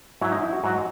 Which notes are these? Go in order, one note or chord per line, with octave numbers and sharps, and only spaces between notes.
G#2 F#3 E4
D#4
E4
F#4
G#2 F#3 F#4